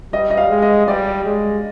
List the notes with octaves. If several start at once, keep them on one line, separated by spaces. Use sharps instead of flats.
G3 D#5
D#5
F5
G#3
D#5
G3 D5
G#3